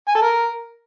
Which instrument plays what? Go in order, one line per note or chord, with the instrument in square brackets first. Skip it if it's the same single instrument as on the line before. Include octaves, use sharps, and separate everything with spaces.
[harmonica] G#5
A4
A#4